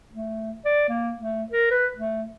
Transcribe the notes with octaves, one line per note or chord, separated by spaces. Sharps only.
A3
D5
A#3
A3
A#4
B4
A3